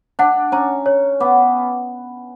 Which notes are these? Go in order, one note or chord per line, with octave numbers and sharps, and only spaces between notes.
D4 F#5
C#4 A#5
C#5
B3 D6